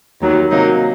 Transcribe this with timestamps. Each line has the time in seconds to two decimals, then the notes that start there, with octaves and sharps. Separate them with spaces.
0.21 D#2 D#3 F#3
0.51 C3 F#3 A#3 D#4